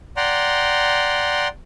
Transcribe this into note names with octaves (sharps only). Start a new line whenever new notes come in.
D5 F#5 G5 A#5 C6